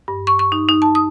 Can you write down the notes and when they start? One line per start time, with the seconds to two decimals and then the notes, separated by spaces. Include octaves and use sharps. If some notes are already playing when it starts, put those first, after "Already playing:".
0.08 G2
0.27 C#6
0.39 C#6
0.52 D#4
0.69 D#4
0.82 A5
0.95 D#6